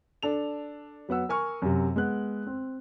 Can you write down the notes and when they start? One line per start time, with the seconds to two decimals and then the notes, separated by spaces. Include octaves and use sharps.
0.22 D4 A4 F7
1.09 F#3 B3 F#5 E6
1.29 A#4 G#5 C#6 F6
1.62 F#2 C3
1.96 G#3 B3 F#6
2.47 C4